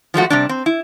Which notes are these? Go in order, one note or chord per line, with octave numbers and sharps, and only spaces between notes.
F3 G#3 A3 F#4
C3 G3 D4
C4
E4